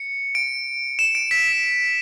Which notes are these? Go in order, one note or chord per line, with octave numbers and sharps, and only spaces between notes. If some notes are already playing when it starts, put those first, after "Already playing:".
Already playing: C#7
D7
E7
D7
B6